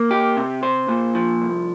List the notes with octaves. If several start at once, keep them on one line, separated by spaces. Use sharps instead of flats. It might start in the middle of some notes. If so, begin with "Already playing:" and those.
Already playing: A#3
G4
C3
C5
A#2
F3
C2